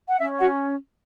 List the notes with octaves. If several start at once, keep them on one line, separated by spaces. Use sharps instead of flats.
F#5
C#4 E5
F#4 F#5